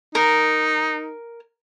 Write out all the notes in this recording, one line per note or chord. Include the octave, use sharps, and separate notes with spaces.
D#4 A#4